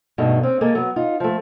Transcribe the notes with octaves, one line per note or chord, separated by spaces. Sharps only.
G2 B2 A3 D#4 G#4
C4 C#4
G#3 A#3 G#4 A4
F#3 B3
D#4 F4
F3 A3